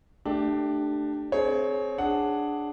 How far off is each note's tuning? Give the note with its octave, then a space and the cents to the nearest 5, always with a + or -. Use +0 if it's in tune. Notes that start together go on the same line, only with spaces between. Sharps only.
A3 +0 D4 +20 G4 -5
C4 +0 G#4 +30 C#5 +0
D4 +0 G#4 +0 F#5 +0